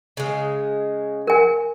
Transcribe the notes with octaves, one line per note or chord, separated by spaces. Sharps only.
C#3 G#3
A#4 G#5